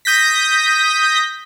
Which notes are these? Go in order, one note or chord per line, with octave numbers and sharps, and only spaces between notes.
D#6 G6 A#6 B6